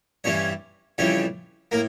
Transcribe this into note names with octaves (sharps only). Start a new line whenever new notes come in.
G2 E3 G3 C#4 C#5
F2 C#3 E3 G3 C#4 C#5
A2 A#3 A#4